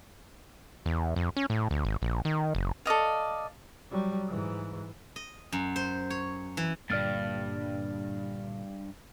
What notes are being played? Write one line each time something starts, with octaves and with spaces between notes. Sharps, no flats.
E2
F2
C#4
A2
D2
G#1
A#1
D#3
F#1
A4 D5 D#5 F5
F#3 G3
G#2 E3
D#5
F#2
C5
C#5
E3
G2 A#2 D3 A#3 D5 F6 A6